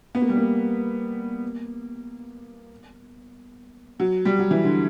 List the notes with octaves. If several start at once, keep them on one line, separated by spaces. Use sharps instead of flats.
B3
A#3
G3
A#3
F#3
G3
F#3
E3
D3